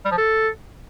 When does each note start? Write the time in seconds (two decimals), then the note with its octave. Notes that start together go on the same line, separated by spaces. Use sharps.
0.05 G3
0.11 F3
0.18 A4